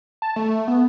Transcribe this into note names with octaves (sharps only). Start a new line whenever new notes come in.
A5
A3
B3